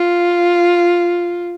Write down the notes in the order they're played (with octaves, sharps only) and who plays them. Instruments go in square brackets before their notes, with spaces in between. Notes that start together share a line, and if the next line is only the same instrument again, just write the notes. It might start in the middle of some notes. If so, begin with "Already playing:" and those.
Already playing: [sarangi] F4